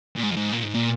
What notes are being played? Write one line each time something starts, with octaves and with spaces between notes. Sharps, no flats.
A#2
G#2
F2
G#2
A#2
G#2
A#2